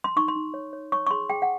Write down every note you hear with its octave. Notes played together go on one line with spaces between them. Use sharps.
C6
D#4 C#6
C6
D#4
C#5
C#5
C#5 C#6
C#6
G#4 C6
G#4 G5
F#5